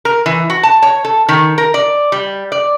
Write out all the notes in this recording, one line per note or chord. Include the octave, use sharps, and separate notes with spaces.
A#4
E3
F#4
A5
C#5
A4
D#3
A#4
D5
G3
D5